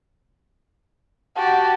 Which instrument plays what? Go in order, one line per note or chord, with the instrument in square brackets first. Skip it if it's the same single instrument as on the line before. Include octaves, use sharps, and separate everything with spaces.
[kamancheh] F#4 G4 [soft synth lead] A5